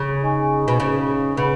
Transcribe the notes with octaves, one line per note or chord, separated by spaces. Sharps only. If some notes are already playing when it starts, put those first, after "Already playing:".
Already playing: C#3
D#4 G#4 D#5 G#5 C#6
B2
C#3
C#3 B4 F#5 B5